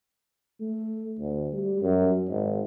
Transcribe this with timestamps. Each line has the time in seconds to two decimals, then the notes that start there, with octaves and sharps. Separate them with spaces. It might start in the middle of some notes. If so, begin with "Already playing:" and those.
0.61 A3
1.19 D2
1.53 G3
1.81 F#2
2.28 G#1